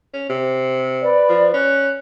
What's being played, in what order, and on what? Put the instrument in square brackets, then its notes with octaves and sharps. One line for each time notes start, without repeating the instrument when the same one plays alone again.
[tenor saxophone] C#4
C3
[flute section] B4 D5
[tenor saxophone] F3
[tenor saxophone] C#4 [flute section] F#6